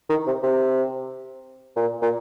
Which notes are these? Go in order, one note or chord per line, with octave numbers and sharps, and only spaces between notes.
D#3
C3
C3
A#2
A#2